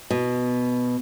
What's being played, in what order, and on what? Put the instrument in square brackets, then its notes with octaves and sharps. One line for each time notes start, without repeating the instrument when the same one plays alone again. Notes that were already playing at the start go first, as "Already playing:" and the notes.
[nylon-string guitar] B2